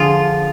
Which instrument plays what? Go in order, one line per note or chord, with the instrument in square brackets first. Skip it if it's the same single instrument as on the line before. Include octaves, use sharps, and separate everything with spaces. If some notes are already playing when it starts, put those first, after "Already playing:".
Already playing: [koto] D3 F3 F4 G#4